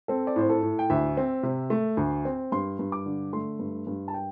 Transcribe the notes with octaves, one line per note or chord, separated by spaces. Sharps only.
C4 A4
D5
A2 C5
A4
A2
G5
D2 E5
C4
C3
A3
D2
C4
G2 C6
G2
D6
D3
A3 C6
G2
G2
A5
G5